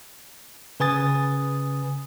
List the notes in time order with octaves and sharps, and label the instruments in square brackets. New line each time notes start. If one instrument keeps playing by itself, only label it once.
[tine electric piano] C#3 B4 G#5 D#6 A6